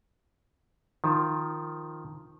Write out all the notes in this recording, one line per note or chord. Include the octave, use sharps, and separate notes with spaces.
D#3 F3